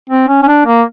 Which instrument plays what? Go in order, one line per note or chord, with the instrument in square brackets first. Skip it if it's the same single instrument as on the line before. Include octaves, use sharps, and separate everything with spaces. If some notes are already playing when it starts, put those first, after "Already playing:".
[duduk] C4
C#4
C#4
D4
A#3